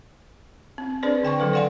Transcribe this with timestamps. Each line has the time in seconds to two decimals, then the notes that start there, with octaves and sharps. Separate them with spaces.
0.78 C4
1.03 C4 D4 G#4 B4 C5 D5
1.23 D3 G5 G#5 C#6
1.39 D3 D#3 F#3 A4 B4 F5
1.53 D5 F5 F#5 G#5 C6